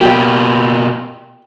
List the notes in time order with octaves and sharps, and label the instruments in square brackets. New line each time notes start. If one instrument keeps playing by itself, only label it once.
[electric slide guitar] B2 A#3 [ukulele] G4 G5